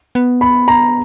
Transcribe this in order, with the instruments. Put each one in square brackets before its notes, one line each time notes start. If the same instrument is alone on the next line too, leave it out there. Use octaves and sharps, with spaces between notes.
[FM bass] B3
[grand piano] B5
A#5